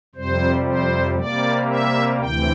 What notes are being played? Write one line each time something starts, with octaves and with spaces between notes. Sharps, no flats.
F2 C3 G3 C5
C5
C3 G3 A#3 D5
E5
D2 C3 E3 G5